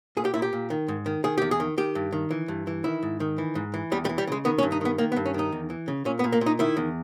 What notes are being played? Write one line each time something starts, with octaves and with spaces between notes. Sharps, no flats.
A#2 G#4
G4
A#2 E4
G4
A#2
D#3
G#2
D#3
D#3 G#4
E2 G4
G#4
D#3
D#3 G4
G2
D#3
E3
G2
E3
D#3 E4
G#2
D#3
E3
G#2
E3
E2 G3
G3
E3
G3
C#3 G#3
D#3 B3
C#4
G2
D#4
D#3 B3
D#3 A#3
B3
G2
C#4
D#3 D#4
E2
E3
C#3
A#2 C#4
B3
A#2
A#3
A#2
D#4
D#3 E4
E2